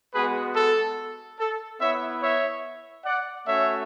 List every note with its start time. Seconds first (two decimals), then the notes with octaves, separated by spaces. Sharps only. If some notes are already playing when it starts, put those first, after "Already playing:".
0.14 G#3 B3 F#4 G#4 B4
0.56 A4
1.39 A4
1.80 B3 E4 C#5 E5
2.22 C#5 E5
3.05 D5 F#5
3.47 A3 C#4 F#4 C#5 E5